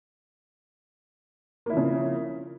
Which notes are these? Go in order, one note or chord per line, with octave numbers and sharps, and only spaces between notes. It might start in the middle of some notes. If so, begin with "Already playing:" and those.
C#3 F3 A#3 E4